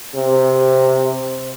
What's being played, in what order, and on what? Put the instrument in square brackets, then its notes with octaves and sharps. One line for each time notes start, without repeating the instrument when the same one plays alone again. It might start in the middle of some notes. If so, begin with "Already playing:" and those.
[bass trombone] C3